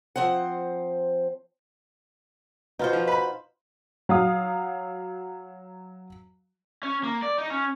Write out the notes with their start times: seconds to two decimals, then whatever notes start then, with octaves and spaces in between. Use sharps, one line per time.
0.16 F3 C4 C5 F#5
2.79 B2 D#4 F4 C5
2.93 F3
3.07 B4 B5
4.09 F#3 F5 D#6
6.83 C#4
7.04 A#3
7.22 D5
7.38 D#4
7.50 C#4